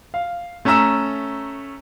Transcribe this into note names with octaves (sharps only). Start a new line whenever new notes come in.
F5
A3 C#4 E5 A#5 E6 E7